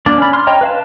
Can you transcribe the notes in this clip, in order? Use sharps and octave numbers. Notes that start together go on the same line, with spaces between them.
A#3 D4 D5
C#4 B5
C6 F6
C#5 D#5 G5 A#5
B4 F5 A5